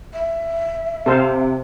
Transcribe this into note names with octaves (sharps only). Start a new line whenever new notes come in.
E5
C3 A4 C5 F5